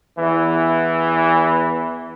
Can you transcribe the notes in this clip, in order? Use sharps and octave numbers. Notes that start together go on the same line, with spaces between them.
E2 E3